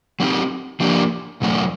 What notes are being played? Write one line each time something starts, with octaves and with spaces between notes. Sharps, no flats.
F#3 A3 C4 D#4 G4
F3 A#3 D4 G4
E2 B2 F#3 A3 C#4